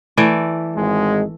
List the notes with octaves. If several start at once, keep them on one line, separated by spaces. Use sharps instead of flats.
E3 A3 D5
G#1 G#3